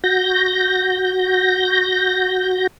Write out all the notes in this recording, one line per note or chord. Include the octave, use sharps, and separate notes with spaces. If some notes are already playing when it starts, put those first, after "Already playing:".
F#4 G6 A#6